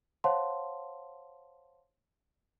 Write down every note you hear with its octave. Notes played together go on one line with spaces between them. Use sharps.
C5 C#5 F5 F#5 A5 C6